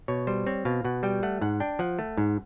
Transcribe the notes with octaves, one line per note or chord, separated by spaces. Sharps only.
B2 C#5
G3 C5
C4 C#5
B2 F5
B2 F#5
G3 G5
A3 F#5
G#2 F#5
D4 G5
F3 F#5
A3
G#2